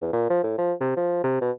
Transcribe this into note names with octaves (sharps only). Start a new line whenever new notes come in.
E2
A#2
F3
A2
F3
C3
F3
C3
B2